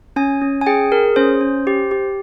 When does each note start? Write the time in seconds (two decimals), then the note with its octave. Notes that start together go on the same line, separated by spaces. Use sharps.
0.16 C#4 G#5
0.41 C#4
0.61 G#5
0.66 G#4 G5
0.92 G#4 A#4
1.16 C#4 C5
1.41 C#4
1.67 G4
1.91 G4